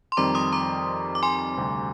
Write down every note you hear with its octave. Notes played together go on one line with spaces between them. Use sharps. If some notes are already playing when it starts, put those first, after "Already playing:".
C6
F2 D#3 G3 C4 A#5 D6
C6 D#6
A#5 D6
D6
G#5 C6
D2 C3 G3 C4